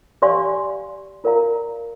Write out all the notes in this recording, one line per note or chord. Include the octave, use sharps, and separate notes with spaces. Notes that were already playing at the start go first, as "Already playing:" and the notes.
G4 D5 F5 G#5 C6
F4 A#4 D5 F5 A#5